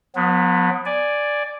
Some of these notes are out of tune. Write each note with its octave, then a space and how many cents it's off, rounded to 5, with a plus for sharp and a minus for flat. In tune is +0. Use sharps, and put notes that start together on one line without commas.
F#3 -45 B3 +0
D5 +0 G#5 +0